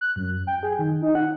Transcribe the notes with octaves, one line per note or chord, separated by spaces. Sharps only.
F#6
F#2
G5
G#4
D#3
D#4
F#5